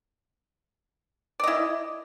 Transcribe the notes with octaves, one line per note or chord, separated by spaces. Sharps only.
E4 D5 D#5